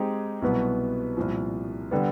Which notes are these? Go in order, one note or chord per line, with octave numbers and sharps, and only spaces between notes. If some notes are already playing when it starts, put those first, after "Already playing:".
Already playing: G#3 C4 D#4 G4
C2 B2 F#3 B3
C2 A#2 F3
D3 G3 B3